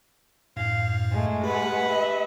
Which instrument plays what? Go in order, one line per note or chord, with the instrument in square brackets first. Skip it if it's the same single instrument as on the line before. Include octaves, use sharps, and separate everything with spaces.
[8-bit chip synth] F#2 A2 [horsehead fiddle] F5
[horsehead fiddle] G#3 A3
[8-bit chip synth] G4 B5 [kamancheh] B4 F#5
[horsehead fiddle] D#5 E5